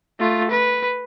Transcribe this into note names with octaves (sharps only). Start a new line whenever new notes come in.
A3 F4
B4